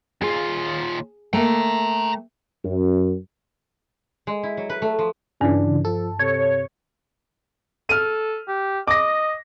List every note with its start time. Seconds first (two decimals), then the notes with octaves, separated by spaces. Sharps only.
0.22 D#2 F4 G#4
1.33 A3 A#3 G5 A#5
2.64 F#2
4.27 G#3
4.43 E4
4.57 F#3
4.69 B4
4.82 A3
4.99 F3
5.41 G2 C#3 E3 D4
5.85 F3 A4
6.19 C3 C#5
7.89 A4 F6 D#7
8.48 G4
8.88 D#5 D6 A#6